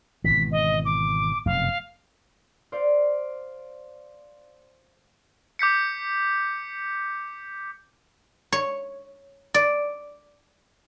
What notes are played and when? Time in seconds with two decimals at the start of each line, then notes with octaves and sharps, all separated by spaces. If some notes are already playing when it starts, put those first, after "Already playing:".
0.24 G#1 B2 E3 B6
0.51 D#5
0.85 D6
1.46 F1 F#2 B2 F5
2.72 C5 D5 F5
5.59 D6 G6 B6 C#7
8.52 C#5
9.54 D5